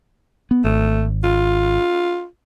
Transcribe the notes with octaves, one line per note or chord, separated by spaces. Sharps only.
B3
G#1 A3
F4